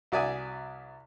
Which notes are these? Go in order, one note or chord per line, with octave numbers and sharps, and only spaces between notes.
C2 F#4 D5 E5 G#5 D#6